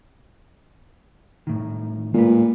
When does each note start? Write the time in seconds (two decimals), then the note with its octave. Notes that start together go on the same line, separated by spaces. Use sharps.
1.47 A2 D#3
2.14 A#2 G#3 B4